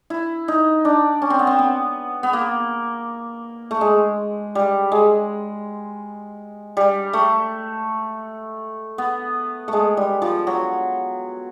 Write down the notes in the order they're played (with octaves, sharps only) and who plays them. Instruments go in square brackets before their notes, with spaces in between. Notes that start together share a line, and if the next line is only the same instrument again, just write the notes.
[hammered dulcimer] E4
D#4
D4
C#4
C4
B3
C4
B3
B3
A#3
A3
G#3
G3
G#3
G3
A3
B3
G#3 A3
G3
F3
F#3